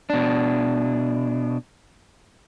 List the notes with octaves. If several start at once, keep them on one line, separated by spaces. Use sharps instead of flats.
B2 D4